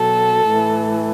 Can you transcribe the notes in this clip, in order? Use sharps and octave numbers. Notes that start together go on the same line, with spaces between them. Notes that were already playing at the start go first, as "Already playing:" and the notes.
Already playing: B2 F#3 A4
A2 E3